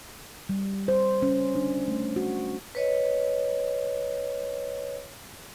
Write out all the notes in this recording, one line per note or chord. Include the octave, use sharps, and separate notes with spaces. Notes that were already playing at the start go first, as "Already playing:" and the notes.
G3
C5
C#4
D4
A3
F#4
B4 C#5 D#5